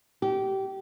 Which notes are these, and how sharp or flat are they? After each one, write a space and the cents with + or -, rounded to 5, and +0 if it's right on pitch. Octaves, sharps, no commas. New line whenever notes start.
G4 -20